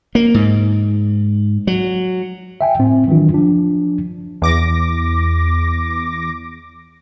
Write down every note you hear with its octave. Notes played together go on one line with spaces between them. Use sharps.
A#3
G#2
F#3
E5 G5 G#5
A2 C4
D#3 E3 F#3 D4 F4
F3 D4
E2 D6 A#6